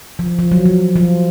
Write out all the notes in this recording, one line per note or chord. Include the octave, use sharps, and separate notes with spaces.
F3
F3
F#3
F3
F3